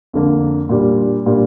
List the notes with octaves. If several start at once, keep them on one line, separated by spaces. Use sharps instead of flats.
F2 D3 A#3
A#2 G3 D4
A#2 G3 D4